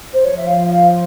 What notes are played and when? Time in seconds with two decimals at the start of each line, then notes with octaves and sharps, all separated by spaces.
0.13 C5
0.24 F3 C#5
0.37 E5
0.46 F5
0.70 F5